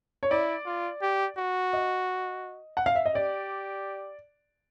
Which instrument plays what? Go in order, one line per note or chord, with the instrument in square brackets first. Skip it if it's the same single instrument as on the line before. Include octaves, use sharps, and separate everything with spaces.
[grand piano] C#5
[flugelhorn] E4 [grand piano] D5
[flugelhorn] F4
G4
F#4
[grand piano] D#5
F#5
F5
E5
D#5
[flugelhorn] G4 [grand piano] D5